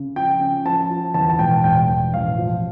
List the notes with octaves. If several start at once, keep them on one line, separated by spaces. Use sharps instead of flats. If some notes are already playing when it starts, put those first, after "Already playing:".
Already playing: C#3
F3 G5
C#4
F3 A5
F3
E2 A5
A5
E1 G5
E1 G5
E1
A1 F5
F3